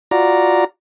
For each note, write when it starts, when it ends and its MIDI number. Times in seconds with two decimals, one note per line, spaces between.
0.11 0.64 65
0.11 0.64 66
0.11 0.64 74
0.11 0.64 82